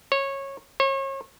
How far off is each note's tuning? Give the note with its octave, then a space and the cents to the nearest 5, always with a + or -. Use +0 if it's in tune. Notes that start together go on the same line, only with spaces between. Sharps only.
C#5 -15
C#5 -35